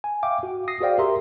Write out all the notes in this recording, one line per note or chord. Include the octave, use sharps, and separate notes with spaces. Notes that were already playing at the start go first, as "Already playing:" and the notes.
G#5
E5 F5 G5 D6
F#4
D#6 A#6 C7
F#4 G#4 C5 D5 F5 G5
G4 A#4 E5 A#5 C6